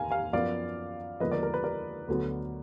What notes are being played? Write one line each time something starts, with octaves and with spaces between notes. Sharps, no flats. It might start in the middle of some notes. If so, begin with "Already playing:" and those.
Already playing: D#2 D#3 F5 G#5 A#5
F5 G#5
F#2 F3 B3 D5 F5
D#2 D3 F3 G#3 B3 B4 D#5
A#4 D5
A#4
B4
A#4 D5
D2 D3 F#3 B3